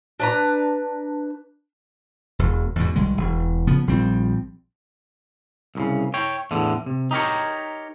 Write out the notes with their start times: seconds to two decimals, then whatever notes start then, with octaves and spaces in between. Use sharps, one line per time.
0.20 D4 B4 A#5
2.39 E1 E2
2.76 E2 G#2 B2
2.96 B1 D#3 G3 G#3
3.17 E1
3.67 C#3 F3 B3
3.87 A#1 F3 G3 C4
5.75 C2 A2 C#3
6.14 C#5 G5
6.51 E2 A2 D3
6.86 C3
7.11 D#4 G4 A#4 C#5